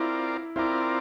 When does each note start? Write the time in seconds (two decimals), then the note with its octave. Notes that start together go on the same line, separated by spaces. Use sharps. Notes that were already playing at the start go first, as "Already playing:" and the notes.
Already playing: C4 E4 F4 A#4 D5
0.56 C4 E4 F4 A#4 D5